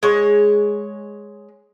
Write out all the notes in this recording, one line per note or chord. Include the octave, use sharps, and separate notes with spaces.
G#3 C#5